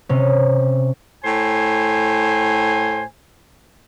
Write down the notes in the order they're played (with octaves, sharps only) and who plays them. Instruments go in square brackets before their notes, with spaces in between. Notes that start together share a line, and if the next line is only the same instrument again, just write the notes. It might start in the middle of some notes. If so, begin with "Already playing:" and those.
[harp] C3 C#4
[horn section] A2 C5 G#5